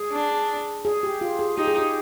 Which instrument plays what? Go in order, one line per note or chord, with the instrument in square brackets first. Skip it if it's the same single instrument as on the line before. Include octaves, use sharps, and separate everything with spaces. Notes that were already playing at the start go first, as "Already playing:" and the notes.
Already playing: [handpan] G#4
[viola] D4
[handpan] G#4
G4
F4
G#4
[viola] D#4 [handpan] G4
[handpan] G#4
G4